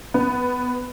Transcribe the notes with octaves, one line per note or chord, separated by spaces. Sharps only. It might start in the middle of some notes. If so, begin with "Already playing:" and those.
B3